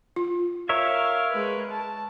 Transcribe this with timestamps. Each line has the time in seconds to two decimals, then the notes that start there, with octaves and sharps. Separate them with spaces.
0.16 F4
0.69 A#4 C#5 E5 F5
1.32 G#3 B4
1.70 A5